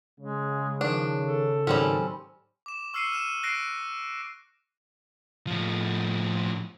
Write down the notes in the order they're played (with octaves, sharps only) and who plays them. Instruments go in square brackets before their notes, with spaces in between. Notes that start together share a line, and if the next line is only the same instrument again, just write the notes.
[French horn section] C#3 [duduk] G#3
[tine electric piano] D#3 C#6 [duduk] F3 [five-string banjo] D4
[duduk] A4
[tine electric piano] G#2 D#3 F#3 [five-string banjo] G3 C4 C#4
[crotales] D6 E7
C#6 E6 F6 C7 C#7 D#7
F6 D#7 E7
F#6 A#6 C7 D7
[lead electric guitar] A2 F3